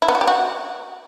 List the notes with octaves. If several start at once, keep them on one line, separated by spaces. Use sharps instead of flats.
E4
B3
F#4
G4
F#4